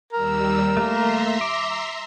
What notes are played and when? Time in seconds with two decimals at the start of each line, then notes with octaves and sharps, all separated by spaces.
0.13 D#2 G3 A#4 E6
0.77 A3 A#3 E5 A#5 C6
1.41 D6